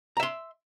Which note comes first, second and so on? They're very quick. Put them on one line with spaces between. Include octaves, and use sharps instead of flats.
A#5 E5 C6